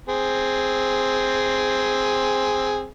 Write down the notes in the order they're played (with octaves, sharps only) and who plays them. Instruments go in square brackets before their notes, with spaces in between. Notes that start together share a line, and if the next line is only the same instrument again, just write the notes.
[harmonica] C4 G#4